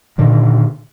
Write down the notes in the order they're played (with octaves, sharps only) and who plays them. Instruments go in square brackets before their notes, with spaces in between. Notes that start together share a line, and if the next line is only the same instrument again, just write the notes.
[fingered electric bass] A#2 D3 D#3